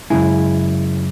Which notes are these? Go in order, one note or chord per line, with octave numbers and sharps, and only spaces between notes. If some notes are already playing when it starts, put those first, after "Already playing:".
F#2 C#3 G#3 E4 G#4